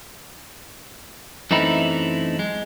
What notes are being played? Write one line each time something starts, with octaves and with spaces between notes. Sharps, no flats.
F#2 E3 A3 C4 D#4 E4
G#3